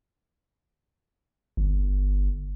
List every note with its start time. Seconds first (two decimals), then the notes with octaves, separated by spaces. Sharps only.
1.57 G1